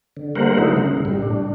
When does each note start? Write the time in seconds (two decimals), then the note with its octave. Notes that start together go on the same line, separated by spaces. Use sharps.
0.17 D3
0.36 G3 A3 A#3 A#4 C5 F#5
0.59 D3 F#3 A3 D#4 E4
0.76 C#3
1.05 A2 G3
1.22 D4